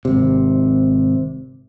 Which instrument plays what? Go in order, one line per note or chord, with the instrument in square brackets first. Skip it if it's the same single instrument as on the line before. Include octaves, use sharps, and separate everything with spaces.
[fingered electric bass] G#1 C3